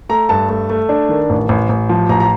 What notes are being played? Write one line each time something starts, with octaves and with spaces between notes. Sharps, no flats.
A3 A#5
G2 A5
A3
A3
D4
D#3
A1
A1
A1
F3
A1 A#5
A#5